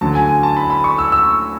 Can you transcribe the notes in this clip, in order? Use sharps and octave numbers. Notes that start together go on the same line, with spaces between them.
D2 D3 F#3 A5
G#5
G#5
A5
B5
B5
C#6
E6
E6